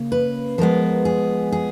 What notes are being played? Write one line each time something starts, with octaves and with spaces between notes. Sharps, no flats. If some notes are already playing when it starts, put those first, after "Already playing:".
Already playing: C#3 A#3 C#4
B4
F3 G#3 B3 A#4
G#4
G#4